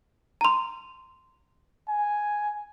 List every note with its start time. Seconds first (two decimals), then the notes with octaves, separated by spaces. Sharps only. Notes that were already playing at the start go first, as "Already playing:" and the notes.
0.41 A#5 C6
1.88 G#5